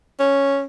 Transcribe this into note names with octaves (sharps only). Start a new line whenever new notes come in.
C#4